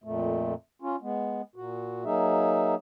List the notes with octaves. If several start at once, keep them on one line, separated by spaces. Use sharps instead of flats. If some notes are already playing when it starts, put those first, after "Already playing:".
F2 A#2 A3
C#4 F4
G#3 B3
A#2 F#4
F#3 A#3 D#4 G#4 E5